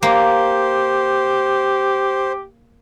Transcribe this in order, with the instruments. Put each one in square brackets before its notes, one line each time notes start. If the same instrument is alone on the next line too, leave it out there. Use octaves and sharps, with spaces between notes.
[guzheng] A#3 [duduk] G4 [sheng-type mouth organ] C5